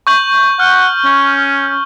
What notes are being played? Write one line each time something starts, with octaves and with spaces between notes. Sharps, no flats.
C#6 G6 F#7
F#5 F6
C#4